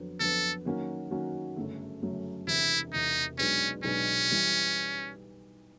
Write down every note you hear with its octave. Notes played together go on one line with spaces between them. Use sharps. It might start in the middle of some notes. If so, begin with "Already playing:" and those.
Already playing: F2 D3 F#3 B3
F2 D3 F#3 B3 A4
D#3 F#3 A#3 C#4 F#4
D#3 F#3 A#3 C#4 F#4
G1 F#2 C#3 F#3 A3
G1 F#2 C#3 F#3 A3
E1 E2 C3 E4
E1 E2 C3 D#4
B1 B2 G#3 B3 C#4 D4
B1 B2 G#3 B3 C#4 D4
E3 G3